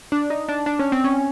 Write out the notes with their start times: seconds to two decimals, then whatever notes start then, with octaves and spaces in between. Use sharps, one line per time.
0.12 D4
0.30 D#4
0.49 D4
0.66 D4
0.79 C#4
0.92 C4
1.04 C#4